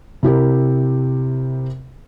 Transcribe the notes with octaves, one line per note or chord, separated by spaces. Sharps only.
C3 E4 G4 A#4